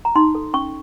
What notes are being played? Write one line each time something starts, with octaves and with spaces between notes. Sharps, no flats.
A#5
D#4 C6
A4
C#4 C#6